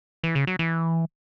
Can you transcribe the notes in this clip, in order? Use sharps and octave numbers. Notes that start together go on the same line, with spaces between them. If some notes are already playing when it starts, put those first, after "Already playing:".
E3
C#3
F#3
E3